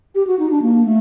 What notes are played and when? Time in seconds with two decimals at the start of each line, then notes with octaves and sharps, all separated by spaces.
0.15 G4
0.27 F#4
0.39 D#4
0.51 D4
0.62 A#3
0.85 A3